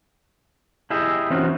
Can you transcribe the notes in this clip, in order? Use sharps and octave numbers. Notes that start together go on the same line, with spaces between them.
E4 G4 G#4 D#5 E5
E3 C4 C#4 D#4 F#4